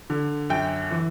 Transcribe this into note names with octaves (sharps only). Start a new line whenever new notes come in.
D3
F#2 G5
E3